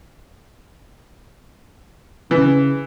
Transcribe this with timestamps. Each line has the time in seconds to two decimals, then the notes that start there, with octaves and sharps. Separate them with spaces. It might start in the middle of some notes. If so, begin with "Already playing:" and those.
2.31 C#3 E3